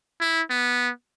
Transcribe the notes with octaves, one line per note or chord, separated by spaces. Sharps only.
E4
B3